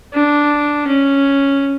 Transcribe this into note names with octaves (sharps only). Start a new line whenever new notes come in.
D4
C#4